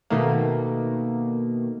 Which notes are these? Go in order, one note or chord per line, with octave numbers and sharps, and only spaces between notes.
B2 D#3 A3 A#3